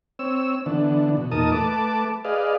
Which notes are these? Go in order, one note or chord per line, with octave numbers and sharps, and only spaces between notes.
C4 C#5 E6
D3 E3 B3 D4
B2
E2 A#2 D#4 A#4 A5 D#6
A3 B4 A5 D6
G#4 B4 D5 D#5 F5